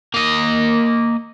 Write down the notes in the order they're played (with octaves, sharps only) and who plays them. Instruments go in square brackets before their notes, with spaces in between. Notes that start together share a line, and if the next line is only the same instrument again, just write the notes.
[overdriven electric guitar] A#3 D#5